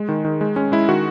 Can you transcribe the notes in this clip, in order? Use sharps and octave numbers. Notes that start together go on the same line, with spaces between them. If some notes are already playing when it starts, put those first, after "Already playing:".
Already playing: G#3
D#3
D#3
G#3
G#3 C#4
G#3 E4
D#3 F#4